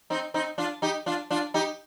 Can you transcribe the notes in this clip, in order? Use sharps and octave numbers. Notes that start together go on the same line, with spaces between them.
C4 D#4
C4 D#4
D4 F4
D#4 G4
D4 F4
D4 F4
D#4 G4